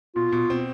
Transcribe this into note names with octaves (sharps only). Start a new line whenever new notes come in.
B2 F4
B2
C4